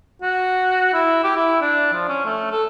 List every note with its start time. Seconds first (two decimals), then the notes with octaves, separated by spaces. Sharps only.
0.22 F#4
0.93 E4
1.24 G4
1.37 E4
1.61 D4
1.93 F3
2.09 C#4
2.25 A3
2.51 A4